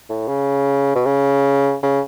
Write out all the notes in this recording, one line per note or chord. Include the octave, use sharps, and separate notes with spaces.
A2
C#3
B2
C#3
C#3